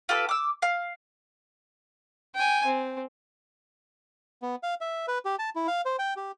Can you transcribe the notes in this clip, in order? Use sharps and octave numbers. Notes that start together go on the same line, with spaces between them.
F4 G4 A4 B4
D6 E6
F5
G5 G#5
C4
B3
F5
E5
B4
G4
A5
E4
F5
C5
G5
G4